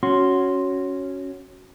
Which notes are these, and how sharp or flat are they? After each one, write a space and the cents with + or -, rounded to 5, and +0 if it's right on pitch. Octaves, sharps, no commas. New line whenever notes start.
C#4 +0 F#4 +0 C6 +0